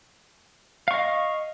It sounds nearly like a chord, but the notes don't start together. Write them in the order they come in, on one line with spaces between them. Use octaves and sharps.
F5 C#6 D#5